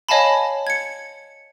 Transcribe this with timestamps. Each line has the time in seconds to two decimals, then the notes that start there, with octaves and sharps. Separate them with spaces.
0.09 C#5 D#5 F5 G#5 A5 B5
0.67 G#6 C#7